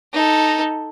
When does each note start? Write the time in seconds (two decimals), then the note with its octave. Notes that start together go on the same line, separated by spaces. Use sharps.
0.13 D#4 A4